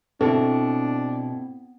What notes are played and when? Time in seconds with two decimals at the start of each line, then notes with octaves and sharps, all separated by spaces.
0.21 B2 C4 D4 E4 A4